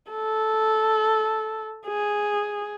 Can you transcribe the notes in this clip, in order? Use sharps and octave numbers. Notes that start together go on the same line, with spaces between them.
A4
G#4